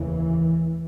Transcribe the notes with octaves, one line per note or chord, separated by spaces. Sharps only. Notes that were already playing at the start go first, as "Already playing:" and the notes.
Already playing: F1 D#2 C#3 E3